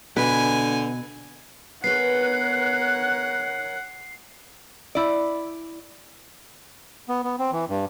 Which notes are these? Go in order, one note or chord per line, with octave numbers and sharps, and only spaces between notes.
B2 D3 B4 G#5
B3 G#4 A#4 B4 C#5 F#5 F#6 C7
E4 D5
B3
B3
C4
E3
G2